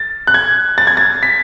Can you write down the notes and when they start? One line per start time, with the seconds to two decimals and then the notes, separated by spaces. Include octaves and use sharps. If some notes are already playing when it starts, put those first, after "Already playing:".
Already playing: A6
0.27 F#6
0.34 G#6
0.78 A6
0.87 G#6
0.97 A6
1.23 B6